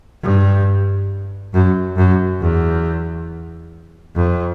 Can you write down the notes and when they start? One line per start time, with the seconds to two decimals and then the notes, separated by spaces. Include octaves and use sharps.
0.23 G2
1.54 F#2
1.97 F#2
2.41 E2
4.16 F2